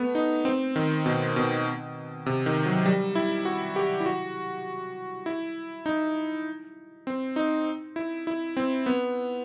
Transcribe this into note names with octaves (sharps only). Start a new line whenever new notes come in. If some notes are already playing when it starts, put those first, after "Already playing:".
Already playing: A3 B3
D#4
C4
D#3
B2
B2
C3
D#3
F#3
G3
E4
F#4
G4
E4
F#4
E4
D#4
C4
D#4
E4
E4
C4
B3